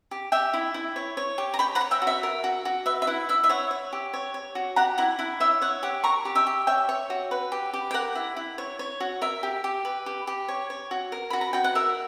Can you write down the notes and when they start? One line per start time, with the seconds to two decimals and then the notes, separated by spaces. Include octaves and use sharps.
0.11 G4
0.32 G4 E5 G5
0.54 E4
0.74 E4
0.96 C#5
1.17 C#5
1.38 G4
1.54 A#5
1.59 C#5 G5 B5
1.75 F#5 A#5
1.81 C#5
1.91 E5 G5
2.02 F#4
2.07 E5
2.23 A#4
2.44 F#4
2.65 F#4
2.86 B4 E5
3.02 E5
3.07 E4 F#5
3.29 E4 E5
3.44 E5
3.49 C#5 F#5
3.71 C#5
3.93 G4
4.14 C#5
4.34 C#5
4.55 F#4
4.76 G4 F#5 A#5
4.98 E4 F#5 A#5
5.19 E4 F#5
5.40 C#5 E5 G5
5.62 C#5 F#5
5.83 G4 F#5
6.04 A#4 A#5 C#6
6.25 G4
6.35 E5 G5
6.47 G4
6.67 C#5 E5 G5
6.89 C#5
7.10 F#4
7.31 B4
7.52 G4
7.73 G4
7.91 G5
7.94 A#4 F#5
8.15 E4
8.37 E4
8.58 C#5
8.79 C#5
9.00 F#4
9.21 A#4 E5
9.43 G4
9.64 G4
9.85 B4
10.06 G4
10.27 G4
10.48 C#5
10.70 C#5
10.91 F#4
11.12 A#4
11.30 F#4 B5
11.41 A#5
11.53 F#4 G5
11.64 F#5
11.75 A#4 E5